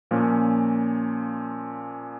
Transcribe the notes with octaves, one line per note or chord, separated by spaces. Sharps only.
A#2 F3 A#3 C#4